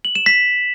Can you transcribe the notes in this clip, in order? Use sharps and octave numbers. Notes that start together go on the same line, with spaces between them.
F#7
E7
B6